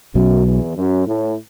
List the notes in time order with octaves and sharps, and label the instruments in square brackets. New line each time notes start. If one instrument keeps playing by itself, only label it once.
[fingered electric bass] B1 B2 F#3 [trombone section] F#2
[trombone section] E2
F#2
A2